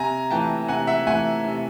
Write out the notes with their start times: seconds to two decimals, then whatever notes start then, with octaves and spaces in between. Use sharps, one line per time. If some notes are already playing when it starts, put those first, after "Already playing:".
Already playing: C3 G#5 A#5
0.31 E3 A3 G5 A5
0.68 C3 F#5 G#5
0.87 E5 F#5
1.07 E3 A3 F#5 G#5
1.44 C3